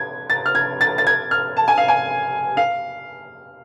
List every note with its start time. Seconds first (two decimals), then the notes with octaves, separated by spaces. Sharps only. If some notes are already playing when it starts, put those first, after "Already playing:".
Already playing: G#6
0.30 A6
0.46 F6
0.55 G#6
0.81 A6
0.98 A6
1.07 G#6
1.31 F6
1.57 A5
1.68 G#5
1.78 F5
1.88 G#5
2.57 F5